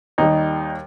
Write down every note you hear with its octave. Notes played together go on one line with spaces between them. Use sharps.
D#2 D#3 G3 D#4